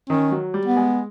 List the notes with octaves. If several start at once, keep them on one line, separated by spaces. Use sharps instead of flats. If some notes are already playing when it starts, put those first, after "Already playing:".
D#3 C#4
F#3
G3
B3
G#3